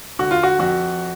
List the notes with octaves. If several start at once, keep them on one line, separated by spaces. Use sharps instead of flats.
D3 F#4
F4
F#4
F2 F#4